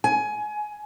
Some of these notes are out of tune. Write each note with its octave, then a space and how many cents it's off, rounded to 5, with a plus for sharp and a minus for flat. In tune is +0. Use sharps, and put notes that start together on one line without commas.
G#5 +20